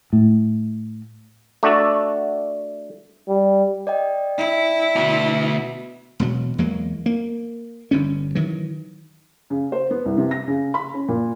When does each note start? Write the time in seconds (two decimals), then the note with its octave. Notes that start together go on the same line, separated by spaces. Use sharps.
0.13 A2
1.63 A3 D4 F#4 A4
3.28 G3
3.87 D5 D#5 G5
4.38 E4
4.96 D2 B2
6.20 E1 B2 F#3
6.58 E2 F#3 G#3 A#3
7.06 A#3
7.91 G1 G2 C#4
8.35 D#3 E3 F#3
9.50 C#3
9.72 C5
9.90 B3
10.05 C2
10.17 C3
10.31 A#6
10.47 C#3
10.74 B5
10.94 C#4
11.09 A#2